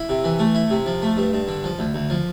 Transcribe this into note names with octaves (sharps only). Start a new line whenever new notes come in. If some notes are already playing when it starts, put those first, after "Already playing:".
Already playing: E4
C3
E3
A3
E4
C3
F3
A3
G2
G2
D3
F3
D2
D2
F3